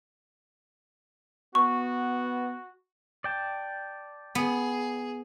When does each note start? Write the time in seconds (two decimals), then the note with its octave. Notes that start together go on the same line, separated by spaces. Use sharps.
1.55 B3 F#4 C#6
3.24 D5 G5 A5
4.35 B3 G#4